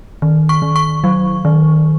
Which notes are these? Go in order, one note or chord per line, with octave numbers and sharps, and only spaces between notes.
D#3
C#6
D#3
C#6
F#3
D#3